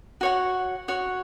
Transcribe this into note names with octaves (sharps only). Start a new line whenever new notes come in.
F#4 C#5 F#5
F#4 C#5 F#5